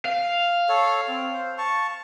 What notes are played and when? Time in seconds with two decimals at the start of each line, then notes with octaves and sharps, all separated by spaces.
0.05 F5
0.69 A4 C#5
1.08 C4
1.33 C5
1.58 A5 C#6